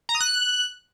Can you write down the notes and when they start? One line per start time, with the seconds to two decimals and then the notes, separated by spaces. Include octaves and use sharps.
0.09 A#5
0.15 D#6
0.20 F#6